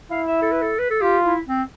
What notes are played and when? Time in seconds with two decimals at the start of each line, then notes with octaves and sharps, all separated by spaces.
0.11 E4 F5
0.27 E5
0.42 A4
0.51 B4
0.62 A4
0.79 B4
0.90 A4
1.01 F4 G4
1.25 E4
1.47 C4